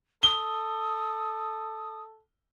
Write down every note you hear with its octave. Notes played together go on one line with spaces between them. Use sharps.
A4 D#6 G7